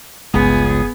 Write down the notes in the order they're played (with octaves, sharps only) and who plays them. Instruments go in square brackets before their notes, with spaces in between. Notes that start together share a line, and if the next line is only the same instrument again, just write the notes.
[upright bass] G1 [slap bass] C#2 [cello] B3 [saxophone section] G#4